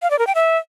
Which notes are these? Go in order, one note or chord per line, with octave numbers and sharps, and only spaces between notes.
F5
D5
A#4
G5
E5